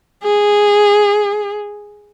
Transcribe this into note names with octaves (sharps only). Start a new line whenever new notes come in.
G#4